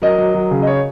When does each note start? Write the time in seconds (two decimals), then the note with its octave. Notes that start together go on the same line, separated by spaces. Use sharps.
0.02 F#3 A#4 D#5
0.18 F#3
0.34 F#3
0.51 C#3
0.62 D#5
0.67 C#5